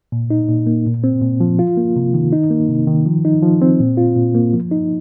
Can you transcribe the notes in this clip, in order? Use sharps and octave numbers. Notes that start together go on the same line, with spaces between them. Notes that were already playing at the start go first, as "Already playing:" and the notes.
A#2
D#4
A#2
A#3
A#2
C4
A#2
F3
F4
A#3
C3
D#3
D#4
A#3
C3
D#3
F3
D#4
F3
C4
A#2
F4
A#2
A#3
F3
D#4